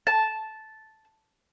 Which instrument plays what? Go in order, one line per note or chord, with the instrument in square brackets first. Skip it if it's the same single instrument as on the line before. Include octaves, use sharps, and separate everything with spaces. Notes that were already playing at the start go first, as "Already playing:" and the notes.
[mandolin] A5